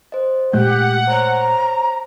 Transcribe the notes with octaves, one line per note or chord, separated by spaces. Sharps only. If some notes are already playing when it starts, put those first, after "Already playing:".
C5 D#5
A#2 G#3 A3 G4 F#5 G6
C5 C#5 A#5